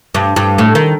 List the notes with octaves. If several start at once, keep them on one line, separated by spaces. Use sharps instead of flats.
G2
G2
A2
D#3